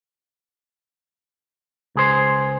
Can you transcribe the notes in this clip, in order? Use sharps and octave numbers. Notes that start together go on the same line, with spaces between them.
C#2 G#4 C5